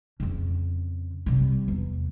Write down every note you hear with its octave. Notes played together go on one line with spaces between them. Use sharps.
F2 C#3
C3 G3
E2